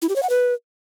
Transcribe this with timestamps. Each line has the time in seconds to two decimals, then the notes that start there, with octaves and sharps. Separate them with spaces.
0.02 E4
0.09 G4
0.16 C#5
0.23 F#5
0.30 B4